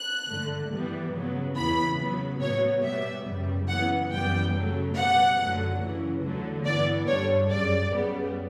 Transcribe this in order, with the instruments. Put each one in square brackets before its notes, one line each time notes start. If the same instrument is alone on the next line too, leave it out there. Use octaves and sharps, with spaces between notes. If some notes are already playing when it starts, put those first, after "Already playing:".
Already playing: [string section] F#6
G2 D3 A3
G2 E3 G3 B3
C#3 F#3 B3
E2 C#3 E3 B3 B5
C#3 F#3 B3
A2 F#3 B3 C#5
B2 G3 B3 E5
F#2 C#3 G3
C#3 E3 B3 F#5
F#2 E3 G3 B3 G5
C#3 F#3 A3
B2 G3 B3 F#5
F#2 D3 F#3 A3
F#2 C#3 E3
E2 D3 F#3 A3
G2 E3 B3 D5
G2 D3 G3 C#5
F#2 C#3 G3 D5
F#2 C#3 G3 B3